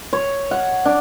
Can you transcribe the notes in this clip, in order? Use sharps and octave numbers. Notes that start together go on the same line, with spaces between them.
C#5
F#5
D4